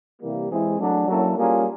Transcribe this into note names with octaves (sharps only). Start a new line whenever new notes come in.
C3 E3 G3 A#3
E3 G#3 C4 E4 G#4
F#3 A3 D4
F#3 A#3 C#4 E4 A4
G3 A#3 C#4 F4 G#4